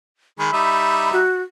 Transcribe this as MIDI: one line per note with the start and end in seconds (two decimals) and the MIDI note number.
0.39 0.49 51
0.39 0.49 56
0.39 1.10 83
0.53 1.21 55
0.53 1.21 63
0.53 1.21 76
1.13 1.42 66